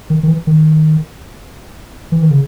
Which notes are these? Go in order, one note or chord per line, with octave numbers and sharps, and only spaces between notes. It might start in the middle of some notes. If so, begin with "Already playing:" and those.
D#3
D#3
E3
D#3
E3
D#3
C#3